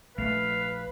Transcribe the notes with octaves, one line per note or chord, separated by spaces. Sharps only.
A#1 A3 B4 F5